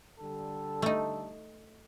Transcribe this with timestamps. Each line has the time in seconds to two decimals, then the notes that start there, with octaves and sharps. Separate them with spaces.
0.20 D3 G3 A4
0.82 A3 D#4